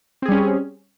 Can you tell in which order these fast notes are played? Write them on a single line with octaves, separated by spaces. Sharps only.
C4 G#4 G3 C#4